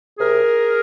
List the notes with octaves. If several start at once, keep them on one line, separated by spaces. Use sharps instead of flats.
C3 G#4 A#4